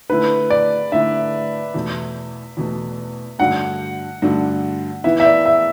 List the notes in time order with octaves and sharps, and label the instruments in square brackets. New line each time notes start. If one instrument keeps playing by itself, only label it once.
[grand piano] D3 A3 E4 [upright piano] B4
[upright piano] D5
[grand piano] D3 A3 E4 [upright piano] E5
[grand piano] E2 B2 A3
E2 B2 A3
[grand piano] G2 D3 A3 D4 F#4 [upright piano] F#5
[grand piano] G2 D3 A3 D4 F#4
[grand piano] E3 B3 E4 [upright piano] E5
[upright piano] E5
D5
E5